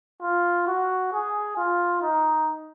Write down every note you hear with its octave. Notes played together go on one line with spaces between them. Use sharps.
F4
F#4
G#4
F4
D#4